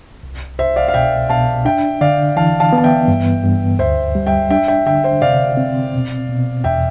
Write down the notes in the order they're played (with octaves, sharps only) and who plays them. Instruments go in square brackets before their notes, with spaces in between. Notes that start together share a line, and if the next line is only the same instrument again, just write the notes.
[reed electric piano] C2
[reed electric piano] C2 [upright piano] C5 E5
[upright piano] D5 F5
F5
[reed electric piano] B2 [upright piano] E5 G5
[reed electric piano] B2 [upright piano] F5 A5
[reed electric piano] D4 [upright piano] E5 G5
[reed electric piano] D3 [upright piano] D5 F5
[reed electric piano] E3 [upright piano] F5 A5
[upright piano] F5 A5
[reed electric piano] B3 [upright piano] A5
[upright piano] E5 G5
[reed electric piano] G2
G2
[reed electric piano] D2 [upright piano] C5 E5
[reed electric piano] G3
[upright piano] E5 G5
[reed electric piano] D4 [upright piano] E5 G5
[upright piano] E5 G5
[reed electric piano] D3 [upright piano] E5 G5
[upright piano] C5 E5
[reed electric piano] C3 [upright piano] D5 F5
[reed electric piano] C4
B2
B2
[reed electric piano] E2 [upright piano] E5 G5